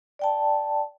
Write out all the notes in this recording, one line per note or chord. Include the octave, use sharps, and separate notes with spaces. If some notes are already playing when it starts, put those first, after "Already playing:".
D5 G5 A5